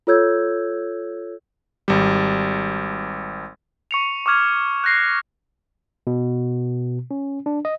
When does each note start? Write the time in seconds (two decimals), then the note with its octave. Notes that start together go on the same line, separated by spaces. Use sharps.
0.07 F4 A4 C#5 E6 G6 G#6
1.88 G#1 G3
3.91 C#6 C#7 F7
4.26 C#6 D6 F6 G#6 F7
4.84 F#6 G6 A#6 C7
6.07 B2
7.11 C#4
7.46 D4
7.65 D#5